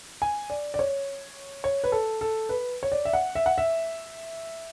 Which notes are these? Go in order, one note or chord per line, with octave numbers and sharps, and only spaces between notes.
G#5
D5
D5
C#5
C#5
B4
A4
A4
B4
C#5
D5
E5
F#5
E5
F#5
E5